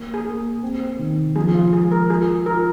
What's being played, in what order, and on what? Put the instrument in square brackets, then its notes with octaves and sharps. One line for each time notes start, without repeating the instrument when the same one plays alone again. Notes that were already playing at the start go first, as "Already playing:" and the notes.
Already playing: [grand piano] A#3
[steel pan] G#4
[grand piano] A#3
C4
D#3
[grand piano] F3 [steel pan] G#4
[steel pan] F4
[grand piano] G#3 [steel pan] G#4
[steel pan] A#4
[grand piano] F4 [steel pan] G#4
[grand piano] F4 [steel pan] A#4